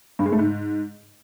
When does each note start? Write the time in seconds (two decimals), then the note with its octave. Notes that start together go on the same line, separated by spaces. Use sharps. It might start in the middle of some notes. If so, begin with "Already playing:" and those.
0.19 G2
0.26 G#3
0.32 A3
0.39 G#2